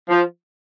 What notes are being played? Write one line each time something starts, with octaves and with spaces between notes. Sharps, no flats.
F3